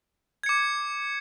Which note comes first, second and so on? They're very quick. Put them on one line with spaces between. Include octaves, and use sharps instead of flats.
G#6 C#7 D6